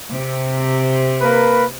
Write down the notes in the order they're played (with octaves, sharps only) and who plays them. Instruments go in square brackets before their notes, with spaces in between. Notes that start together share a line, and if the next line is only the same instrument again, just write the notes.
[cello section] C3
[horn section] A#3 A#4 B4